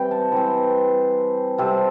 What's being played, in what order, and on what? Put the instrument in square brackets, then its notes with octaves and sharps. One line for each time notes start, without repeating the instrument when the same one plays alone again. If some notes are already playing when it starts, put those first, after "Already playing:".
Already playing: [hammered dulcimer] E3 G3 C4 G5
A5
E3 C4 C5
C3 G3 C4 A4